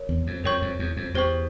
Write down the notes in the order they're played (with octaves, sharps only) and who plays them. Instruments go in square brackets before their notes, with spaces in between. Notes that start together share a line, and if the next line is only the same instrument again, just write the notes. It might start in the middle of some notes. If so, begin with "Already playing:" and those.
Already playing: [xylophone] A#4 C#5
[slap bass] E2
F2
[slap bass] F2 [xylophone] A#4 C#5 G5 C#6 G6
[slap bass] F2
E2
F2
[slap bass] E2 [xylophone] G4 C5 G5 C#6